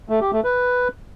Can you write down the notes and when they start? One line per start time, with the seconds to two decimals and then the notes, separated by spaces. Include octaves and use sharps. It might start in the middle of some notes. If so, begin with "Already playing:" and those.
0.09 A3
0.21 G4
0.33 A3
0.44 B4